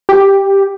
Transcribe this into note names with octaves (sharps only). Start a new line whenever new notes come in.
G4